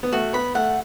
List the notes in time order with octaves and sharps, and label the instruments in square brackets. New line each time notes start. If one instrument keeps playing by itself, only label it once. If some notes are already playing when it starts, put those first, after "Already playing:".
[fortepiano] B3
[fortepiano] A3 [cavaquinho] F#4
[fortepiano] B3 [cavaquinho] B5
[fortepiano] A3 [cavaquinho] F#5